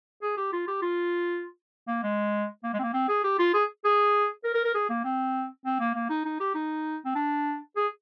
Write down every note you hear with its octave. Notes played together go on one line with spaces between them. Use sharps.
G#4
G4
F4
G4
F4
A#3
G#3
A#3
G#3
C4
A#3
C4
G#4
G4
F4
G#4
G#4
A#4
A#4
A#4
G#4
A#3
C4
C4
A#3
A#3
D#4
D#4
G4
D#4
C4
D4
G#4